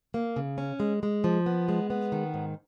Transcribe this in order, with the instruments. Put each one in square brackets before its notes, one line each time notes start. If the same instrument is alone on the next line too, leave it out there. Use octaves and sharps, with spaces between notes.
[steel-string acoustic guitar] A#3
C#3
C#4
G#3
G#3
F3
B3
G#3
B3
D#3
G#2